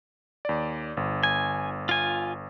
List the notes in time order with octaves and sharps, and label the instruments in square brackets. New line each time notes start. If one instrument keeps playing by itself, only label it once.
[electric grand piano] D#2 D5
G1
[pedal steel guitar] G#5
F4 G#5